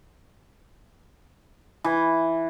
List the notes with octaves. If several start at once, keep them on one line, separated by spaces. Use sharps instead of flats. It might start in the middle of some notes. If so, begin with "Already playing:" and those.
E3